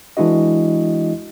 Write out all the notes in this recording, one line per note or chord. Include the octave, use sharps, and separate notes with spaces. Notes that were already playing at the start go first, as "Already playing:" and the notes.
E3 G#3 D4 E4 F#4 D#5